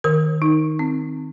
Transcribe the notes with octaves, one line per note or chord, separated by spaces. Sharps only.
D#3 A#4
D#4
C4